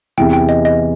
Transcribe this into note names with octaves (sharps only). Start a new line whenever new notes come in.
E2 C3 E3 G5
G5
D#5
D#5